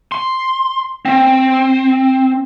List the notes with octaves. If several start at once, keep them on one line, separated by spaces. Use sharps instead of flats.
C6
C4